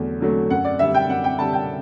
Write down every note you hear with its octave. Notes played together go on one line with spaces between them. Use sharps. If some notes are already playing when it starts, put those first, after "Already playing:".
Already playing: E2 D3 F#3 A3
D3 F#3 A3
F#2 F#5
D5
D3 G3 E5
G5
F#2 F#5
G5
D3 G3 A5
G5